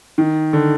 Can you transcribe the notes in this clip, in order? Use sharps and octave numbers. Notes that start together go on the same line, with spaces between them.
D#3
D3